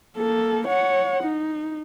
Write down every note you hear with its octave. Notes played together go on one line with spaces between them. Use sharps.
A#3 A4
C#5 F#5
D#4